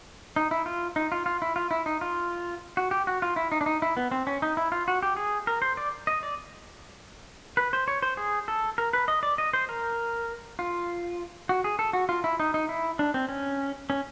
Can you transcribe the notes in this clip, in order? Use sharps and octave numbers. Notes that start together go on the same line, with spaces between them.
D#4
E4
F4
D#4
F4
F4
E4
F4
E4
D#4
F4
F#4
G4
F#4
F4
E4
D#4
D4
D#4
E4
B3
C4
C#4
D#4
E4
F4
F#4
G4
G#4
A#4
C5
D5
D#5
D5
B4
C5
C#5
C5
G#4
A4
A#4
B4
D#5
D5
D#5
C5
A#4
F4
F#4
G#4
A4
F#4
F4
E4
D#4
D#4
E4
D4
C4
C#4
C#4